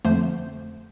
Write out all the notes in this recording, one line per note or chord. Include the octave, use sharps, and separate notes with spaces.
F2 D3 F3 A3 C5